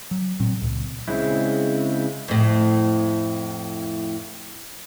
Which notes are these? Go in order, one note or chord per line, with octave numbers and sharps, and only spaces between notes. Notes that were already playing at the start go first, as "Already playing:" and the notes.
F#3
A1 A#2 F#3 C4
C#2 A#2
C#3 G#3 C4 E4
F2 A2